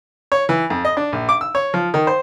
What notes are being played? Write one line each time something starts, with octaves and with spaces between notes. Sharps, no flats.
C#5
E3
F2
D#5
D4
A#1
D6
E6
C#5
F3
D#3
C5